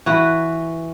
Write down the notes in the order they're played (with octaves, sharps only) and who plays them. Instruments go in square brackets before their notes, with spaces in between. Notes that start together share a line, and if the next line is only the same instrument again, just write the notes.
[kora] E3 F#4 B4